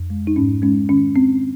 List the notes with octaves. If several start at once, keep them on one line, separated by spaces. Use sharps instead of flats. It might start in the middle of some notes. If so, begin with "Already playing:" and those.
Already playing: F2
G#3
D#4
G#2 C#4
G#3 C#4
D#3 C#4
C4